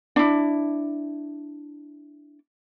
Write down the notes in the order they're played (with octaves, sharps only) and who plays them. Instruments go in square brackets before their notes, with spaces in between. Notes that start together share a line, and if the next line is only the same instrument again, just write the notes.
[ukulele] D4 E4